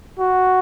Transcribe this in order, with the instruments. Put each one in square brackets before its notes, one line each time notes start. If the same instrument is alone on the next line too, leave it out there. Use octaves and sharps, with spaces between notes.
[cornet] F#4